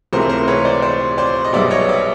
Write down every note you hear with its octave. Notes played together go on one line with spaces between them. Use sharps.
C#2 C3 E3 A3 A#4 C5
A#4 C5
B4 C#5
C5 D5
C5 D5
C5 D5
D#5
B1 B2 G3 B3 D5 E5
C#5 D#5
D5 E5